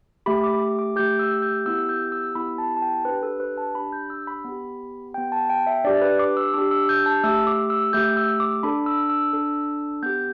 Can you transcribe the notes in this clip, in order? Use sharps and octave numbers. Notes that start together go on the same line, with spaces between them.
A3 G4 B5
D6
D6
A3 G4 G6
E6
G6
B3 E4 G4 E6
G6
E6
B3 E4 G4 B5
A5
A5
G5
D4 G4 B4
A4
B4
A5
D4 G4 B5
G6
E6
B5
B3 G4
B3 G4 G5
A5
G5
E5
D4 G4 D5
B4
D6
E6
D4 G4 D6
E6
G6
A5
A3 G4 E6
D6
E6
A3 G4 G6
E6
D6
D4 A4 B5
E6
E6
D4 A4
B3 G4 G6